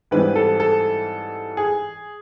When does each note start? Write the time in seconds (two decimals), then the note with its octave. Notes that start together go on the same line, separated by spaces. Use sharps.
0.11 G#2 E3 G3 C4 B4
0.36 A4
0.60 A4
1.57 G#4